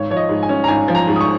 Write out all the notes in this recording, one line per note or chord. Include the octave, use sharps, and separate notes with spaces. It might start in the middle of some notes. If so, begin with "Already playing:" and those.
Already playing: G#1 C#5
F3 C#5
D#5
G#2
G#5
C#4
A#5
G#1 G#5
F3
A#5
G#2
D#6
C#6